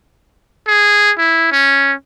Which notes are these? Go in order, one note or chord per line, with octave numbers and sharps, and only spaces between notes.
G#4
E4
C#4